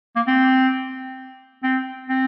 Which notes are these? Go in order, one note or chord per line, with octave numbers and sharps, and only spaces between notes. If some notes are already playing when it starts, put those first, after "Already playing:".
A#3
C4
C4
C4